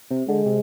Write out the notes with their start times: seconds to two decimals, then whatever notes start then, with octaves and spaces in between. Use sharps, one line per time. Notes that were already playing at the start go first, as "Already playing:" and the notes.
0.10 C3
0.28 D3 G#3
0.46 C3